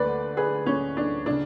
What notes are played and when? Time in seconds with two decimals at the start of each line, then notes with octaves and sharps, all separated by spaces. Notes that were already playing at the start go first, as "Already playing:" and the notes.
Already playing: D2 D3 B4 D5
0.37 G#4 B4
0.66 C#4
0.97 D4
1.26 C#3 D4